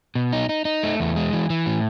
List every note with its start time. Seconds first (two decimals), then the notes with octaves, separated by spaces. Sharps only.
0.15 B2
0.33 D#4
0.49 D#4
0.65 D#4
0.83 A3
1.00 E2
1.16 G#3
1.33 E3
1.50 E3
1.66 A2